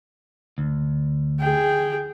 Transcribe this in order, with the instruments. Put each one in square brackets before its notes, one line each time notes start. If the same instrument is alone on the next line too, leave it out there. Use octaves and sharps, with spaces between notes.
[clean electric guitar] D2
[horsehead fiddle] G#4 G5